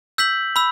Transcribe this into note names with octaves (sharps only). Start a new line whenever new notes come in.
E6 G6 B6 F#7
B5 E6